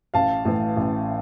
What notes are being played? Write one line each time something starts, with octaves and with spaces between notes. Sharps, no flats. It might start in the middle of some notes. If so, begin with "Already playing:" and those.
A1 F5 A5
A2 E3
A1